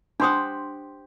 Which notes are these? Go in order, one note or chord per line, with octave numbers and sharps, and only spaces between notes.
D4 G4 C5 F#5 C6 D#6